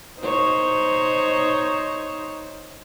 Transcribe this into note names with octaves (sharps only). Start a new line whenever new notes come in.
D#4 C5 C#5